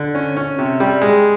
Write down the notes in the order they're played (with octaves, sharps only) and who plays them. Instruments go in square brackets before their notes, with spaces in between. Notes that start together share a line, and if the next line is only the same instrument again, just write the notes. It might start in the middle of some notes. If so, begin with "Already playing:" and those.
Already playing: [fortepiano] D3
C#4
C#4
C3
G3
G#3